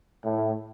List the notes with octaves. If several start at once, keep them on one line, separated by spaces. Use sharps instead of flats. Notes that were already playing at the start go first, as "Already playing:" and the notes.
A2